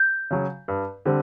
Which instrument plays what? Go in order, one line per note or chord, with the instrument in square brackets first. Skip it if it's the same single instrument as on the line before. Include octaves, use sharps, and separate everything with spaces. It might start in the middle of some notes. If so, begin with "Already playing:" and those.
Already playing: [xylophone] G6
[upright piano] C#3 F#3
G2
D3 G3 C4